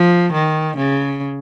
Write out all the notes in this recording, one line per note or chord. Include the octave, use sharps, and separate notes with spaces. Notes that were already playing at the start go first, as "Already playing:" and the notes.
Already playing: F3
D#3
C#3